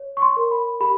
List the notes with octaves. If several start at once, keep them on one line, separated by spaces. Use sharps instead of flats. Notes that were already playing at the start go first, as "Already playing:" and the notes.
Already playing: C#5
C#6
C6
A#4
B5
G4 B5